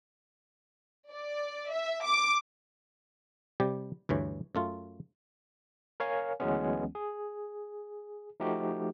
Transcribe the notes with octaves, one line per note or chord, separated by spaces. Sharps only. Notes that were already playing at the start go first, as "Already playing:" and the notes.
D5
E5
D6
C3 G3 G4
D2 G2 E3 C#5
F#2 A3 F4
A#4 C#5 F5 G#5
D2 E3 F#3 G#3 B3 C#4
G#4
F3 A3 D#4 F#4 G4